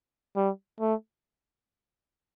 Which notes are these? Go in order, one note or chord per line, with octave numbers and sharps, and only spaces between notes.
G3
A3